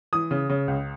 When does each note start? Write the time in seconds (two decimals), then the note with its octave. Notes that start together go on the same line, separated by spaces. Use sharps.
0.13 E3 D#6
0.31 C#3
0.49 C#3
0.68 C#2